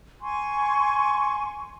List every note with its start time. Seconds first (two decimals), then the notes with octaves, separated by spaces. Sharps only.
0.21 G#5 C6 C#6